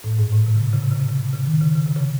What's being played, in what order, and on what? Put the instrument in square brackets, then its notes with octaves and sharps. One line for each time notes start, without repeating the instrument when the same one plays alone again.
[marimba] A2
G#2
A2
C3
C#3
C3
C#3
C3
C#3
C3
C#3
C3
C#3
D#3
C#3
C#3
C3
C#3